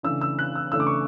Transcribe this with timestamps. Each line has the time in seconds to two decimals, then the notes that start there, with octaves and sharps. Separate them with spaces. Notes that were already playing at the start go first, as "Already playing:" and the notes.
0.03 C#3 E3 A3 D4 E6
0.21 E6
0.39 F#6
0.55 E6
0.72 C#3 E3 A3 D4 E6
0.80 D6
0.87 C#6